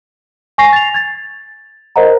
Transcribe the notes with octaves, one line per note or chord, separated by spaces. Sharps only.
G#5 C#6 A#6 C7
A6 F7
G#6 A6
A#4 C5 D#5 F#5 A#5